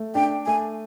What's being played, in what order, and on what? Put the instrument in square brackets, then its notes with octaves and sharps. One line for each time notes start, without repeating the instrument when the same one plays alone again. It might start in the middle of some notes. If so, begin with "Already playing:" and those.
Already playing: [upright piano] A3
[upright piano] D4 [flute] G5
[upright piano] A3 [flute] G#5